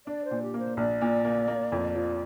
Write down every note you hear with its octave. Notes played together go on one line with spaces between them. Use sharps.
D4 D5
C5
A#2
G4
A#3
C5
A#1 D5
A#2
A#3
A#3
F2
F3